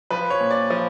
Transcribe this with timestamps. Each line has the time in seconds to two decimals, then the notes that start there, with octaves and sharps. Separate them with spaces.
0.10 F3 B4
0.30 C#5
0.40 A#2
0.51 D5
0.70 F3